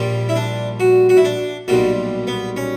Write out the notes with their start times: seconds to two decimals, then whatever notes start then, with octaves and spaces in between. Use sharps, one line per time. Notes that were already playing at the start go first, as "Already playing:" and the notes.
Already playing: A#1 A#2 G3
0.29 E4
0.36 D4
0.80 F#4
1.09 F#4
1.17 E4
1.24 D4
1.68 B1 A#2 G3 F#4
2.27 B3
2.56 C#4